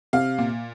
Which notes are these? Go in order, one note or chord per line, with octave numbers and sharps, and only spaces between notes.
C3 F5
A#2